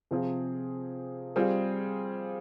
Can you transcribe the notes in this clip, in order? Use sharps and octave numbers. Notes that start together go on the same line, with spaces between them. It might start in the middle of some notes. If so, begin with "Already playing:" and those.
C3 F3 C4 F4 G#4
G3 C4 F4 G#4